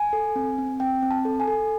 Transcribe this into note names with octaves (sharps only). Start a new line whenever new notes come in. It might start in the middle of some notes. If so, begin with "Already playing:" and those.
Already playing: G#5
A4
C4
C4
C4 G5
C4
A5
A4
G#5
A4